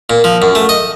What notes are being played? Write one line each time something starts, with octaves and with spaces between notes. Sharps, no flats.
A#2
F3
F#2
A3
D#5